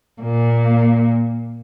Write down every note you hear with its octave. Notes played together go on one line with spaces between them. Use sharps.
A#2 A#3